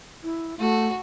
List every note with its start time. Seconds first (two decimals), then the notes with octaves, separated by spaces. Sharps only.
0.23 E4
0.59 A3 F#4